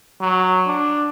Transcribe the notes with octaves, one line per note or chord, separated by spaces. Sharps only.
F#3
D4